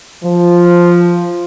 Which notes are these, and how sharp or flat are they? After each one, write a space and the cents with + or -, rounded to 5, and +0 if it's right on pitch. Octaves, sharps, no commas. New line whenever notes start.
F3 +0